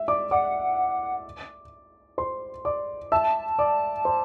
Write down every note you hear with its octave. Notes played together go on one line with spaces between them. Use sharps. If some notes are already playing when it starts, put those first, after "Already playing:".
Already playing: E5
D5 D6
D5 F#5 D6
C5 C6
D5 D6
E5 A5 E6
D5 D6
C5 C6